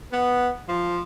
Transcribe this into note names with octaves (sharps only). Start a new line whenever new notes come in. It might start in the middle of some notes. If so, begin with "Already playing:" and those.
B3
F3